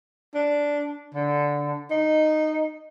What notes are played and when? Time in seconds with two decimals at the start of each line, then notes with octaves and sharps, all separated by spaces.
0.35 D4
1.14 D3
1.91 D#4